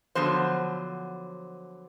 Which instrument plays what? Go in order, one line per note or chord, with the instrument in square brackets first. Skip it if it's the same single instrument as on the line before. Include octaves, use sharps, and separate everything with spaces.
[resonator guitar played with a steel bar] D3 F3 F#3 B3 C5